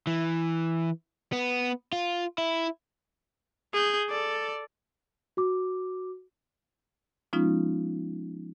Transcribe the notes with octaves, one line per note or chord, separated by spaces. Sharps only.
E3
B3
F4
E4
G#4 G6
A4 D5
F#4 D6
F3 G#3 B3 C#4 D#4 F4